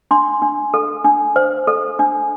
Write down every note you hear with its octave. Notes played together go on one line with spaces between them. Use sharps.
D4 C6
D4
A4
D4
C5
A4
D4